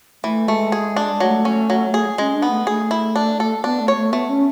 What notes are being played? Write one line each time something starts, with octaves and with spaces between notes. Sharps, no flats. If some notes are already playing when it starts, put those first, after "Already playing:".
E3 A3
G#3 A3
G#4
D4
F#3 A3
C#4
F#3
G#4
G#3 C#4
D4
B3
A3
A3 G#4
E4
D4
A4
B3 D4
A3
C#5
A3
A3 B3
C#4